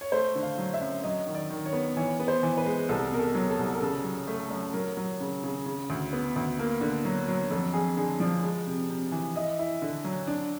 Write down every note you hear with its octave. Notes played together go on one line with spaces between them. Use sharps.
C#5
A3 C5
D3
F5
F#3
E5
F#2
F#3 D#5
D#3
D5
D#3
C#5
B3
E3 C#5
B3
C5
E3
B4
G#3
C2 A4
B2 A#4
A4
F#3
A4
C2
A#4
C#3 A4
F#3
A3
F#2
F#3 A#4
F#3
C#3
C#3
C#3
D2
B3
D2
A#3
D3
F#3
F#3
F2 A4
F2 G#4
D3 G#4
F3 D5
G#3
C3
C3
E3
E4 D#5
E4
D3
F#3
D4